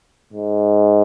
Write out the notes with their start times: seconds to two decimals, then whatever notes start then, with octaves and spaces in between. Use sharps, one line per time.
0.33 G#2